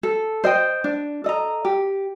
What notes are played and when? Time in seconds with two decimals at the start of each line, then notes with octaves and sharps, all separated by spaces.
0.03 A4
0.44 C5 D#5 G5
0.84 D4
1.24 A4 D#5 A#5
1.65 G4